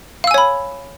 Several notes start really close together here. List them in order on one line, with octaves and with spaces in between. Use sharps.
F5 E6 G#5 C#5 B5